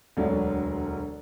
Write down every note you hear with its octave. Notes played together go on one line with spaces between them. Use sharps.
E1 D2 D3 F#3 D4